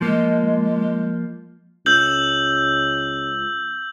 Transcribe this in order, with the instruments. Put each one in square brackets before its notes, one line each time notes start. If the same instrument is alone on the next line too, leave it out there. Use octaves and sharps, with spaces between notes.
[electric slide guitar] F3 A#3 [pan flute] G#3
[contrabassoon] C#2 [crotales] E6 G6 F#7